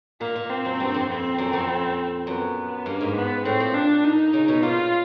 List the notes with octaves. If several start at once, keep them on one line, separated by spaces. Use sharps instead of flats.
A#2 A#3
A#2
C4
F#2
G2
F2
C4
F#2
F2
F#2 B3
G2 A#3
G#2
B3
A2 C4
A#2
D4
D#4
C#3
B2
A#2 F4